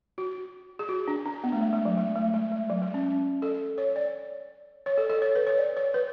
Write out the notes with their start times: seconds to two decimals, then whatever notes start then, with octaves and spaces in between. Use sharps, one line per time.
0.18 F#4
0.79 G#4
0.89 F#4
1.08 D4
1.26 D4
1.44 B3
1.52 A3
1.61 G#3
1.73 G#3
1.85 F#3
1.98 G#3
2.16 A3
2.34 G#3
2.52 G#3
2.70 F#3
2.82 G#3
2.94 C#4
3.42 A4
3.78 C#5
3.96 D5
4.86 C#5
4.98 A4
5.10 A4
5.22 C#5
5.35 B4
5.47 C#5
5.58 D5
5.77 C#5
5.94 B4